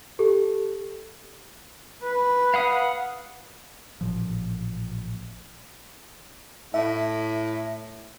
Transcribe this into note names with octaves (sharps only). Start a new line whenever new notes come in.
G4 A4
B4
F5 F#5 D#6
A1 A#2 F3
A2 E5